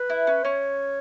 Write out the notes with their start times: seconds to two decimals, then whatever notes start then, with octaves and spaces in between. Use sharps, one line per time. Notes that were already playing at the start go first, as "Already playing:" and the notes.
Already playing: B4
0.10 E4
0.27 C#4
0.43 C#4 C#5